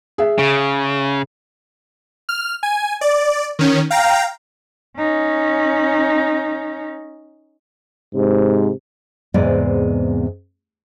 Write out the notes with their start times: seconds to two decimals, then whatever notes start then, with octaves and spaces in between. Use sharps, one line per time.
0.18 G#4 E5
0.38 C#3
2.29 F6
2.63 G#5
3.01 D5
3.59 D#3 C#4
3.90 F5 G5 A#5
4.98 C#4 D#4
8.15 G#2 C3
9.34 E2 G#2 C3 G#3 B3 D5